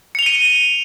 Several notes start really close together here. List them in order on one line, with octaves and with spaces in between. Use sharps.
C#7 F7 G7 D#7